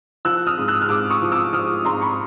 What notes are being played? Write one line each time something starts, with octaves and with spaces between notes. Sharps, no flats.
F3 E6 F#6
D#6 F6
G#2
E6 F#6
F6
G#2 D6 E6
C#6 D#6
F3
D6 E6
F3 D#6 F6
G#2 A#5 C6
B5 C#6